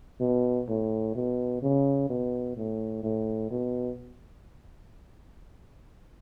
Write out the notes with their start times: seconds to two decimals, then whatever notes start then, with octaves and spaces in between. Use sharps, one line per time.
0.20 B2
0.68 A2
1.15 B2
1.62 C#3
2.10 B2
2.57 A2
3.03 A2
3.51 B2